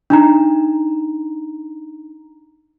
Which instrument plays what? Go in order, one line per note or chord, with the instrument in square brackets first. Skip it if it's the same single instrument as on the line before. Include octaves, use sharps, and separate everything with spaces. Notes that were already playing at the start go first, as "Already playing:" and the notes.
[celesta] D4 D#4 A#5